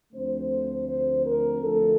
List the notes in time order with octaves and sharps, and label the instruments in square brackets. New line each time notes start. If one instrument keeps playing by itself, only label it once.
[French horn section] D2 D3 F3 A3 C4 C5
C5
A#4
D2 D3 F3 A3 A4